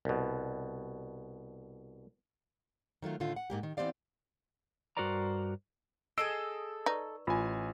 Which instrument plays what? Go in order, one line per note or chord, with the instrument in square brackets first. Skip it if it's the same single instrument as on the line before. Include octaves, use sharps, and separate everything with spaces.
[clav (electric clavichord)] C2 B2
[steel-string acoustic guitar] D#3 F#3 A3 F4
A2 D3 D#3 A3 F4
F#5
G#2 A#3 G4
D#3
E3 B3 C4 G4 D5 F5
[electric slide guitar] G2 F#4 A#4 C5 D5 A#5
[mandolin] G#4 A4 D#5 [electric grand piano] E6 C7 D7
[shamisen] D#4 [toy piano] B4 D5 C#6
[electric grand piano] A1 G#5 [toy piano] F4